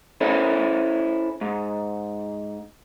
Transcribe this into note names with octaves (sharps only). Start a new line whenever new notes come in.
C#4 E4 A4 C5 C#5
G#2